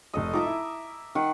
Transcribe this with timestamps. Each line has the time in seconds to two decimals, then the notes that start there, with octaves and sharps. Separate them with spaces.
0.14 F1 A4 D#5 D#6
0.33 D#4 F4 E5 A#5 D6
0.47 E4
1.15 D#3 F#5